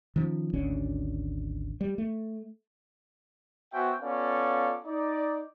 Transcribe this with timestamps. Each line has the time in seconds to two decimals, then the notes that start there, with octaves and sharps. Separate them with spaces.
0.16 D#3 F3 C#4
0.53 G#1 D2 D3 C#4
1.81 G3
1.98 A3
3.73 B3 F#4 C5 E5 G5 G#5
4.02 B3 C#4 F4 A4 D5 F5
4.86 D#4 D5